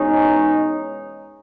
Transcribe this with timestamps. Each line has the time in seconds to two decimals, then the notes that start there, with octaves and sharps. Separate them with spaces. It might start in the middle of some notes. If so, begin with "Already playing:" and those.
Already playing: E2 B2 G#3 C#4 D#4